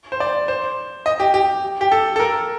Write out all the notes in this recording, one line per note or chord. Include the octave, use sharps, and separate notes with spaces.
C5
D5
C5
D#5
G4
G4
G4
A4
A4
A#4